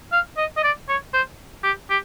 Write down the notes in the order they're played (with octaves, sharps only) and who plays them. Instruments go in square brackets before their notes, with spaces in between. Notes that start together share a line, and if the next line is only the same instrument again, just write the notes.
[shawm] F5
D#5
D#5
D5
C#5
C5
G4
G4